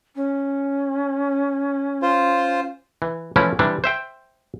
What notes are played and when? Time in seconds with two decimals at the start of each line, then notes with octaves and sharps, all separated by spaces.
0.15 C#4
2.02 F4 C5
3.02 E3
3.36 E3 F3 A3 C#4 E4
3.59 C3 E3 G3 D4
3.84 C5 E5 G5